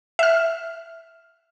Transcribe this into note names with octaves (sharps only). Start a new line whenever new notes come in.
E5 F6